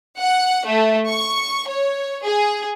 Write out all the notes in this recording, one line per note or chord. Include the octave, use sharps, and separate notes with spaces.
F#5
A3
C#6
C#5
G#4